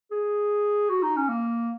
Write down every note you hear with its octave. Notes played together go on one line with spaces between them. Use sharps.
G#4
F#4
D#4
C#4
A#3